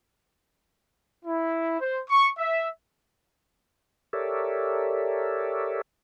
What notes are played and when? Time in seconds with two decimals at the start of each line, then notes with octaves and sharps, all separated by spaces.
1.25 E4
1.80 C5
2.09 C#6
2.38 E5
4.13 G4 A4 A#4 C#5 D5 E5